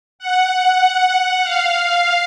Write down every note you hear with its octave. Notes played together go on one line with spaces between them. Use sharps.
F#5
F5